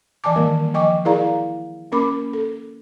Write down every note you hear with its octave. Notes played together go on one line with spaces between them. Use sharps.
E3 D5 G#5 A5 D6
D#3 E3 G3 A#3 A#4
F3 D#5 G5 G#5 C#6 D6
E4 G#4 A#4 D5 F5 A#5
A#3 C#4 A#4 B5 D6
A4